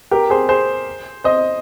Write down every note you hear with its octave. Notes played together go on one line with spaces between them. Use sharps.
G4 A#4
G#4 C5
G#4 C5
C5 D#5